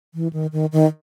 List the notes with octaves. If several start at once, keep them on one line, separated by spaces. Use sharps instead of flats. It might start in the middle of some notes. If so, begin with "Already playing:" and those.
E3
D#3
D#3
D#3